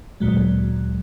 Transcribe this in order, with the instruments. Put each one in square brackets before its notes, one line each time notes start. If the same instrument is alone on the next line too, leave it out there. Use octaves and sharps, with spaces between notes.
[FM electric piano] D2 A#2 F#3 G#3